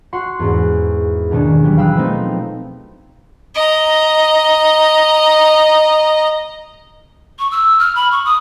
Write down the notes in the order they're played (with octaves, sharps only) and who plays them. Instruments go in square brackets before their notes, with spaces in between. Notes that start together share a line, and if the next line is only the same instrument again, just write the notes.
[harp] F#4 F#5 C6 C#6
E2 G#2 C#4
D#2 B2 D#3 C#4 D4
E3 F#3 G3
F5 G5 B5 D#6 E6 F#6
F3 A3 B3 C4 D#4
[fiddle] D#5 A#5
[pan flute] C#6
E6
F6
B5
C#6
D#6